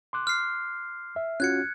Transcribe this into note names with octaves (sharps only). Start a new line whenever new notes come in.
C6 D6 F#6
F6 C7
E5
C#4 F4 F#4 F#6 G#6 C#7